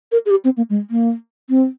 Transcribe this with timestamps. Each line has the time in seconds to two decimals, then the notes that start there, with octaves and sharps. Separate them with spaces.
0.12 A#4
0.26 G#4
0.30 G4
0.44 C4
0.57 A#3
0.70 G#3
0.90 A#3
1.49 C4